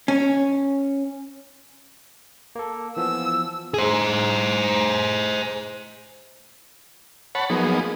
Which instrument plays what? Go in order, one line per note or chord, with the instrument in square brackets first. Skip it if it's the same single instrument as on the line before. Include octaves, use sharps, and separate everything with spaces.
[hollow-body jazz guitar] C#4
[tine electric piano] A#3 A4
[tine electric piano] E3 F3 B3 [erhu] E6
[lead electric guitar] G#4 C5
[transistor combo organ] C#5 F#5 A5 B5
F3 F#3 A#3 B3 D#4 G#4